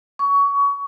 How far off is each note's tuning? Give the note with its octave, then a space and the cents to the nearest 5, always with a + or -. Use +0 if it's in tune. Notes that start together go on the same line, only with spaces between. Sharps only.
C#6 +25